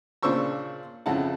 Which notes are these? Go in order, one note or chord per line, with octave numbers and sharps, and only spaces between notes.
A#2 C#3 D4 C5 C#6 E6
F2 C#3 E4 F#5 A5